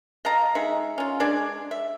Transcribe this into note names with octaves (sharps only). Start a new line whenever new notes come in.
D#5 F5 A5 A#5
G#3 D#4 E5
C#4 F4
G#3 D4 D5 G#5
E5